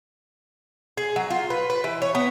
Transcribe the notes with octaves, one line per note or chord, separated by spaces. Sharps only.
G#4
F#3
F4
B4
B4
E3
C#5
B3